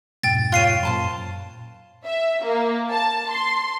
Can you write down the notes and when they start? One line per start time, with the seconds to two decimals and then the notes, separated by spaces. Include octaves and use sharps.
0.23 F2 G#2 B2 G5 A6
0.52 F4 C#5 F#6 C7 D#7
0.83 F#2 A#2 C5 A5 C6
2.05 E5
2.44 A#3
2.91 A5
3.31 C6